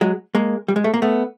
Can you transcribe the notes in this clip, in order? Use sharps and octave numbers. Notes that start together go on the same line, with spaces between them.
F#3 G#3
G#3 A#3
G3
G#3
A3
A#3
A3 B3